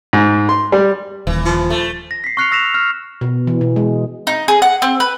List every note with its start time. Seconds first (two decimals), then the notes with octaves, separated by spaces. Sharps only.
0.13 G#2
0.49 C6
0.72 G3
1.27 D#1 E3
1.45 F3
1.70 A3
2.11 A#6
2.24 B6 C7
2.37 C#6 F6 F#6 C7 C#7 F7
2.51 C#6 E6 A#6 B6 E7 F7
2.74 F6
3.21 B2
3.47 E3
3.61 B2
3.76 G#3
4.27 D#4
4.48 G#4
4.62 F#5
4.82 C4
5.00 B4